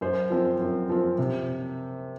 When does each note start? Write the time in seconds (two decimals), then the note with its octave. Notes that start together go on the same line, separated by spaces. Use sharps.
0.01 F#2 C5
0.30 F3 C4
0.60 F#2
0.89 F3 C4
1.18 C3